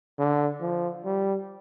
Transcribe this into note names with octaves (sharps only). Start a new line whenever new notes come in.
D3
F3
G3